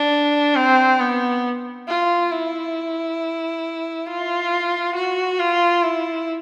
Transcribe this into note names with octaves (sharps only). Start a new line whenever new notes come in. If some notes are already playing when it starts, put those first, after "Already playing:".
Already playing: D4
C4
B3
F4
E4
F4
F#4
F4
E4